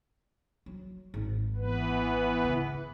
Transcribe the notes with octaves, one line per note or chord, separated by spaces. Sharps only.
F#3
G#1
E3 B3 B4
G#2 C#3